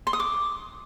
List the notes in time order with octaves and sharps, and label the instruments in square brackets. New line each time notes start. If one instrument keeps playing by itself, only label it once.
[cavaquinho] C6
D#6
D6